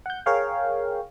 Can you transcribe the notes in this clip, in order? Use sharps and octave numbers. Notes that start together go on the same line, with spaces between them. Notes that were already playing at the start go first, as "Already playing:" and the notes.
F#5 G6
G#4 A#4 C#5 F5 G5